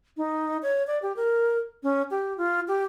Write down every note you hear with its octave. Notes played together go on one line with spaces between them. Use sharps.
D#4
C#5
D5
G4
A#4
C#4
G4
F4
G4